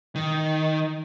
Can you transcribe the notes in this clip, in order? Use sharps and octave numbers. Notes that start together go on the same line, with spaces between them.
D#3